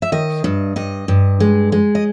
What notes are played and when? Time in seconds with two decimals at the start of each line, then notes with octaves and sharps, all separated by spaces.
0.02 E5
0.12 D#3 D#5
0.44 G2
0.76 G2 D#5
1.08 G2
1.40 G#3
1.72 G#3
1.95 D#5